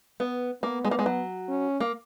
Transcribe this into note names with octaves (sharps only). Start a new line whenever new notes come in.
B3
A#3 B3
G#3
A#3
G#3
F#3
C#4
A#3